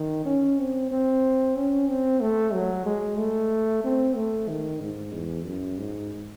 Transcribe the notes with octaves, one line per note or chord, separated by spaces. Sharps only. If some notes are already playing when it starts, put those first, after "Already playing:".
Already playing: D#3
C#4
C4
C4
C#4
C4
A3
F#3
G#3
A3
C4
A3
D#3
G#2
E2
F#2
G#2